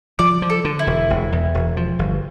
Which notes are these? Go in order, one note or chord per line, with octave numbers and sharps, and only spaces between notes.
F3 D5
F3
A4
D3
E4
E1
E1
E2
E1
F3
G1